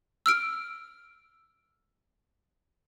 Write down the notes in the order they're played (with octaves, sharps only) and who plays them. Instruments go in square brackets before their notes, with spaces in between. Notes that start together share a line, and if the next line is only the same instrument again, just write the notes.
[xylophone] E6 F6 D7